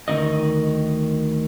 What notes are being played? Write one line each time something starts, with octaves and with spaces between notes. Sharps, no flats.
D2 D#3 D#5